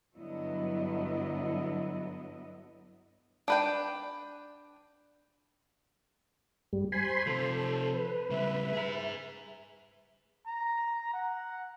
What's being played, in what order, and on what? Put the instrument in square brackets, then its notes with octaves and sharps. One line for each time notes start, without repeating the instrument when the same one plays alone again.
[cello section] G2 D3 F#3 B3 E4 D#5
[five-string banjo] D4 B4 G5
[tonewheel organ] G2 G3
[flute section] C5 [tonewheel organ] G#5 B5 C6
[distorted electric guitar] C3 F3 [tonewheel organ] A4
[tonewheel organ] B4
[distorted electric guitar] C#3 G3 [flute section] E5
[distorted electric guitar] G#4 A#5
[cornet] A#5
F#5